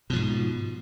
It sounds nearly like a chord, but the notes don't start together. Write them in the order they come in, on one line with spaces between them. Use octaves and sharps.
B2 F3 G#2